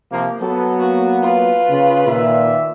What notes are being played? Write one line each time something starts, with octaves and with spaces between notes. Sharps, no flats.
C3 F3 A#3
F#3 B3 A4
A#3 F#4
F4 B4
C#3
A#2 D#3 D5 E5